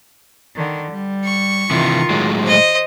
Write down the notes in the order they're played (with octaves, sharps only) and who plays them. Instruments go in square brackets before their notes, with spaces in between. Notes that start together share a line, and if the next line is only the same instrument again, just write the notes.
[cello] D3 D#3
G3
[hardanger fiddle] C#6
[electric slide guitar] C3 E3 [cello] D#3 F4
[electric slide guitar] A2 F#3 G#3
[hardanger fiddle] C5 D#5